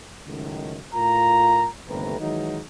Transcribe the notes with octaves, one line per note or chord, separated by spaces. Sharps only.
C#2 F#2 A2 D#3
A2 F4 A#4 A#5
G1 D#2 C3 A3 B4 A#5
D#3 E3 F#3 G#3 D#4